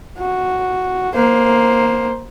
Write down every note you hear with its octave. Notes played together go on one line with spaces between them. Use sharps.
F#4
A#3 C5